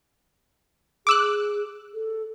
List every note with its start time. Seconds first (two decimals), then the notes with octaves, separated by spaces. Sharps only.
1.07 G#4 D6 E6 F#6
1.94 A4